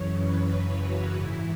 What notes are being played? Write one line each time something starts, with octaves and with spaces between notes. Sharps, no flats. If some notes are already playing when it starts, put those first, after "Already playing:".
Already playing: F#2 C#3 E3 C#5
B4
F#4
G#2 E3 E4